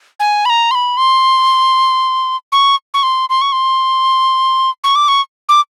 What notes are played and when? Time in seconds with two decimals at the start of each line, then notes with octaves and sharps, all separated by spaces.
0.20 G#5
0.45 B5
0.50 A#5
0.71 C6
0.75 B5
0.97 C6
2.52 C#6
2.94 C#6
3.03 C6
3.30 C6
3.41 C#6
3.52 C6
4.84 C#6
4.96 D6
5.08 C#6
5.49 D6